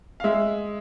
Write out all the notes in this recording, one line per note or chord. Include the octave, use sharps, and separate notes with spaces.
F5
G#3 E5